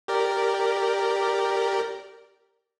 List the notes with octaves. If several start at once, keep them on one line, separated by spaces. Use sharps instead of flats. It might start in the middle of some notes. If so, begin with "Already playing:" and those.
G4 A#4 D5